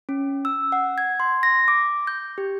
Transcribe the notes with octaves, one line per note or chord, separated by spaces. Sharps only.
C#4
E6
F#5
G#6
C6
A#6
D6
G6
G4